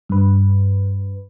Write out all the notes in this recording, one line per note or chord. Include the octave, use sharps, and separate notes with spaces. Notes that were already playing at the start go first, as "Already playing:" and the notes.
G2 B4